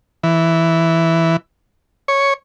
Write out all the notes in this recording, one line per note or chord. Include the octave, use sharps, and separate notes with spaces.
E3
C#5